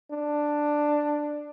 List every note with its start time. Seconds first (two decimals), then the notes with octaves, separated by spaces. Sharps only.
0.11 D4